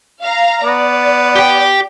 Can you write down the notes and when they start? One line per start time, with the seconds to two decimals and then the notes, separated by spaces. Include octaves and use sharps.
0.23 F5 A#5
0.63 B3 D5
1.36 G4 G5